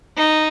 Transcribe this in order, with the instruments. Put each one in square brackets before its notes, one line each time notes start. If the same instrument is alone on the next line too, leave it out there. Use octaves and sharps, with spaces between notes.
[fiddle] D#4